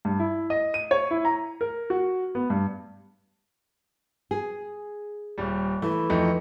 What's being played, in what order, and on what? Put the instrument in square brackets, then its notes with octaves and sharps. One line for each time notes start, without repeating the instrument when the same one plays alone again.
[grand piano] G2
E4
D#5
D#7
C#5
E4
A#5
A#4
F#4
B3
G2
[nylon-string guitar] G#4
[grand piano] D#1 G3
[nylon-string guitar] E3 [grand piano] A3
[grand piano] F2 A3 D#4